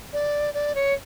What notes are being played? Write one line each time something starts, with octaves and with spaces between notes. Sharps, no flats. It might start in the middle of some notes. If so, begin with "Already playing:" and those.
D5
D5
C#5